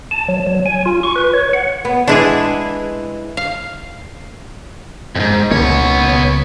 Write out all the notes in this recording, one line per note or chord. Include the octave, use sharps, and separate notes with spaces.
A5
F#3
F#3
G#5
F4
C#6
B4
C#5
F#5
B3
E3 G#3 D4 E4 G#4
F5
F2 G#2
C#2 C#3 A#3 B3 C#5